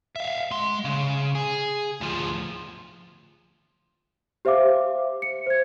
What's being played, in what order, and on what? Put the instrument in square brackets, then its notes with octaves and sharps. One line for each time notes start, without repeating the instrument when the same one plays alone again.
[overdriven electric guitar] E5 F5
G#3 C6
C#3
G#4
D2 F3
[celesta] G4 C5 E5 F5 D6
C#7
C5 G#6